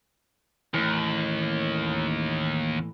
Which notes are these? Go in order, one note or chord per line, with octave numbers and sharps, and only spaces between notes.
D#2 A2 E3